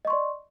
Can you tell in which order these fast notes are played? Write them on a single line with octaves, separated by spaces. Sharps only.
D#5 C#6 C6 D5